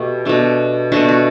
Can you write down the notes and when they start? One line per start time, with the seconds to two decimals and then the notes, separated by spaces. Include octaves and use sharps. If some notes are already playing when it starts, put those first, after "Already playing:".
Already playing: B2 A3 G4
0.25 B2 A3 D4
0.92 B2 A3 D4 F#4
1.09 F#4